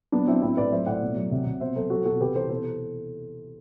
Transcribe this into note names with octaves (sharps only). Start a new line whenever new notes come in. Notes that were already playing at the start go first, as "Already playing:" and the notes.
F#3 B3 D4
F#3 C4 E4
A2 C4 E4
A2 B4 D5
F#3 C5 E5
A2 D5 F#5
B2
F#3
C3
C3
B2 C5 E5
F#3 A4 C5
F#3 F#4 A4
B2 F#4 A4
C3 G4 B4
E3 A4 C5
B2 A4 C5